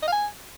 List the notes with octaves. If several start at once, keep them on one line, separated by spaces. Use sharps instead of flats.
D#5
F5
G#5